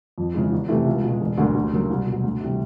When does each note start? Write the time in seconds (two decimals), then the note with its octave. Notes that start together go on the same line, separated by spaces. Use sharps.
0.18 F2
0.34 C#3 E3 G#3
0.52 E2
0.69 C3 E3 A3
0.86 C#2
1.04 B2 G#3
1.21 E1
1.38 D2 D3 F#3 A#3
1.54 D2
1.73 C#3 F#3 A#3
1.90 C2
2.06 B2 F#3
2.24 D2
2.40 C3 E3 G3